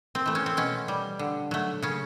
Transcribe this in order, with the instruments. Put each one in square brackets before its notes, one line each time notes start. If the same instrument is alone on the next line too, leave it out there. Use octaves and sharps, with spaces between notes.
[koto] C4
E3 A3
C#4
C4
B2 C#4
G3
D3
F#3 A3
C#3 C#4